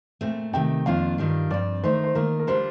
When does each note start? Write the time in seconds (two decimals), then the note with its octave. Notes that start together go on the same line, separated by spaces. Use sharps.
0.21 A#2 A3 C4
0.53 C3 D#3 A3 G5
0.86 F2 D#3 A#3 D4 F4 F5
1.18 G2 D#3 G3 D4 F4
1.50 G2 F3 C4 D5
1.83 D#3 A3 D#4 C5
2.04 C5
2.15 D#3 A#3 F4 A#4
2.39 A#4
2.47 D3 G3 D4 F4 C5